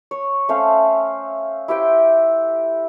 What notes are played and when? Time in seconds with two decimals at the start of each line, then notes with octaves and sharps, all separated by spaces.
0.11 C#5
0.49 A3 C#4 C5 F5
1.68 E4 G4 C5 G5